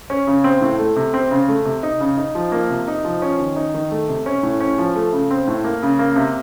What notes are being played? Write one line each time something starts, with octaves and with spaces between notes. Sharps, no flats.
C#4
C#3
C4
A2
A3
C3
C4
C#3
A3
C3
D#4
C#3
D#4
F3
A#3
C3
D#4
F3
C#4
D#3
D#4
D#3
A3
C3
C#4
A2
C#4
F3
A3
C#3
C4
A2
A#3
C#3
A#3
C3